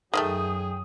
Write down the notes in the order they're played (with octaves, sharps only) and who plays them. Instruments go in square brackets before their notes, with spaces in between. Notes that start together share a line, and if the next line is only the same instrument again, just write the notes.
[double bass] F#2 F#3 [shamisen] D#3 G#3 A3 [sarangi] G#4 [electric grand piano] G5 D#6